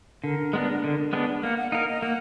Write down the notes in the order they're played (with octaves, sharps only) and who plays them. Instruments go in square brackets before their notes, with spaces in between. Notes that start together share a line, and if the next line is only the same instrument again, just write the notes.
[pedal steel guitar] D3 [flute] A#4
[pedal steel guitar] G#3 B3 D4
D3
G#3 B3 D4
[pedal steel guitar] A#3 [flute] F#5
[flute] F#5
[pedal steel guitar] D#4 A#4 [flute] F5
[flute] D#5
[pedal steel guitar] A#3 [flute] F#5